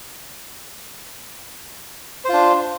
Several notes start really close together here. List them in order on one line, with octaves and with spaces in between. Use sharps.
C5 F4 D4